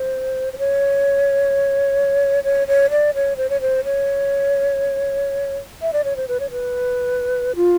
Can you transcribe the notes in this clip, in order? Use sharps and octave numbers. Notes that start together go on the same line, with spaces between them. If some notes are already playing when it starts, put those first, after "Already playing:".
Already playing: C5
C5
C#5
C#5
C#5
D5
C#5
C5
C#5
C5
C#5
E5
D5
C#5
C5
B4
C#5
B4
F4